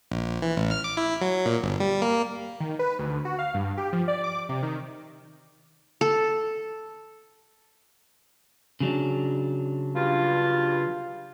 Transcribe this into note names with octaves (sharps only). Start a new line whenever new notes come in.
A#1
E3
A1
F6
D6
E4
F#3
A#2
G1
G3
A#3
D#3
B4
D2
F#4
F5
G2
G4
F3
D5
D6
C3
D#3
A4
C#3 F#3 D4
G2 F4